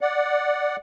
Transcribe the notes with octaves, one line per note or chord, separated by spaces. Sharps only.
D5 F#5